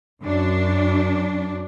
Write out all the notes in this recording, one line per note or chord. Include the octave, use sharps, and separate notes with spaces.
F#2 D4